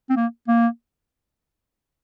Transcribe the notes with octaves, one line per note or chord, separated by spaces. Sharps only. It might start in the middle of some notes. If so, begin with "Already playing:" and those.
C4
A#3
A#3